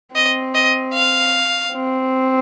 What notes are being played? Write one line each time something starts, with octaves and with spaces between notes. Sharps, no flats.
C4 D#5
D#5
F5
C4